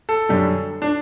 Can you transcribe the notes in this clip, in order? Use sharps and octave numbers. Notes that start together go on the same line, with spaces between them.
A4
F#2 D3 G3
D4